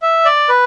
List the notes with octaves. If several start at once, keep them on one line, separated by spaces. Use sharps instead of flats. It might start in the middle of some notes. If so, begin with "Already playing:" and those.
E5
D5
B4